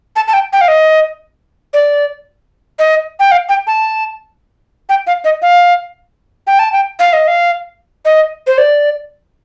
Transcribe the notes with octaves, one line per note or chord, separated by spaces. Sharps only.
A5
A5
G5
G5
F5
D#5
D5
D#5
G5
F5
G5
A5
G5
F5
D#5
F5
G5
A5
G5
F5
D#5
F5
D#5
C5
D5